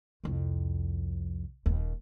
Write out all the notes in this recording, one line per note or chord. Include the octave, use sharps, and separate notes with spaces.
C2 F2
D#1 D#2